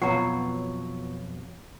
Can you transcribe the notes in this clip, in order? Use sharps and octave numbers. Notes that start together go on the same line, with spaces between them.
F2 B2 F#3 B3 F4 F#5 A#5 C#6